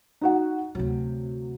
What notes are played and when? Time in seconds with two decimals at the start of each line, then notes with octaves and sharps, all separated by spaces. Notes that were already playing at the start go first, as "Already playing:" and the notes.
0.21 D#4 F#4 F#5
0.75 D2 C3 F#3